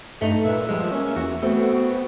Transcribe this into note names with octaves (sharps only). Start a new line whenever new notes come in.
G2 A3 D#4
A#2 B4 E5
F3 G3 G#3
A#3 C#4
E2 F#4
A3 B3 C4 F#4